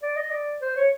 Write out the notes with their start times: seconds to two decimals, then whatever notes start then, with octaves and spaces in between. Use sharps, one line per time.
0.03 D5
0.17 D#5
0.31 D5
0.62 C5
0.76 C#5